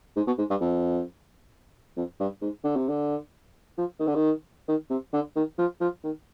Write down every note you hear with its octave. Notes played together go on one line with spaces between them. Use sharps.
G#2
B2
G#2
G2
F2
F2
G2
G#2
D3
C3
D3
F3
D#3
D3
D#3
D#3
C3
D3
D#3
F3
F3
D#3